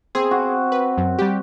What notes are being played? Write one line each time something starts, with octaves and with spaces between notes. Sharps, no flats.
C4 G#4
F#4
B4
F#2
G3 G4